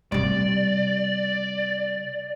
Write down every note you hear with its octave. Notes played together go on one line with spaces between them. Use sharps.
C3 G3 D5